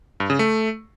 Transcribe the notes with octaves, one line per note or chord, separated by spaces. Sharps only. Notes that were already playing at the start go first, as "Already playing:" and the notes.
G2
C#3
A3